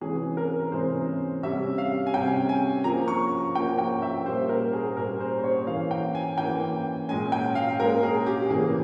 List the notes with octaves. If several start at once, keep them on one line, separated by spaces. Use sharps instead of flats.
C3 E3 G#3 C#4 G#4
A#4
A#4
C3 E3 G#3 C#4 C5
C3 G3 C#4 E5
F5
G#5
C3 G3 C#4 G5
G#5
F3 A#3 C#4 A#5
C#6
F3 A#3 C#4 G5
G5
E5
A#2 G3 A#3 C#4 C5
A#4
G#4
A#2 G3 A#3 C#4 A#4
C5
C5
C#5
E3 A#3 C#4 F5
G5
G#5
E3 A#3 C#4 G5
A#2 G#3 C#4 G#5
G5
F5
A#2 G#3 C#4 A#4
G#4
G4
C#3 E3 A#3 C#4 G#4